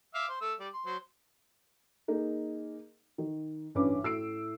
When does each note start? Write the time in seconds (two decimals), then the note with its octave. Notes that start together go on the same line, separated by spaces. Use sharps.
0.14 E5 F5 D6
0.29 C5
0.41 A3 E6
0.60 G3 D5
0.74 C6
0.86 F#3 C5
2.08 A#3 D#4 G#4
3.18 D#3
3.75 A1 G2 C#4 B4 D6
4.04 A2 E6 C7 D7